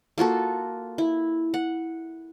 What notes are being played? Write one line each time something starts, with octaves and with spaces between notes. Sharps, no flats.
A#3 F4 F#4 A4
E4
F#5